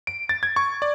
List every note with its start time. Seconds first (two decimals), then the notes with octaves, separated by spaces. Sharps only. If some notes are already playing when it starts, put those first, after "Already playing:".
0.07 D7
0.29 A6
0.43 G#6
0.56 C#6
0.82 D5